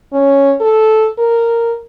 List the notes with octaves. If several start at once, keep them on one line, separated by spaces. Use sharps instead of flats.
C#4
A4
A#4